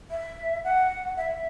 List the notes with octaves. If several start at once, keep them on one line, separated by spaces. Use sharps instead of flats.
E5
F#5
E5